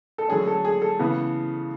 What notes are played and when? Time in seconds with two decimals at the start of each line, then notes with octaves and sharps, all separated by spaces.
0.18 A4
0.28 D3 F#3 A3 C#4 G#4
0.47 A4
0.65 G#4
0.82 A4
0.99 C#3 E3 B3